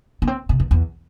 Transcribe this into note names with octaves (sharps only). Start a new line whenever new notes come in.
B3
C4
C3
E2
E2